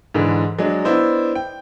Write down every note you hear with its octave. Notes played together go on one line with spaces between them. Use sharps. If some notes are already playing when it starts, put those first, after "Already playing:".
G#2 D3 E3
F#3 G#3 D4
B3 D4 E4 C5 D#5
G5